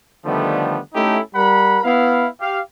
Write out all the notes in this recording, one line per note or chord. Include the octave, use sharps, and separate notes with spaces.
D3 D#3 F3 G3 A3 B3
A3 C#4 D#4 E4 G4 A4
G3 A#4 F#5 B5
B3 E4 F5
G4 F5